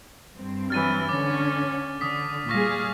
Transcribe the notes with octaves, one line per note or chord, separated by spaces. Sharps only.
G2 C4
E3 F#3 F6 A6 D#7
D3 C#4 C#5 D6 A6
D3 D#6 B6
A#2 G3 G#4 F5 C#6 A#6